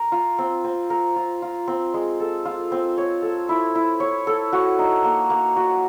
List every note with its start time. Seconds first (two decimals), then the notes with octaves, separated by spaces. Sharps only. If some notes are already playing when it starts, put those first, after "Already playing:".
Already playing: A#4
0.12 F4
0.38 C4
0.64 C4
0.90 A#4
1.16 F4
1.42 F4
1.68 C4
1.94 G#3
2.20 A4
2.45 F4
2.72 C4
2.98 C#5
3.22 A4
3.49 E4
3.75 E4
4.00 C#5
4.27 A4
4.53 F#4
4.79 D#4
5.04 A#3
5.30 A#3
5.56 F#4